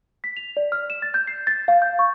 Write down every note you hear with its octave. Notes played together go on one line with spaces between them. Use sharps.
B6
F7
D5
F6
E7
A6
G6
C7
A6
F5
G6
C#6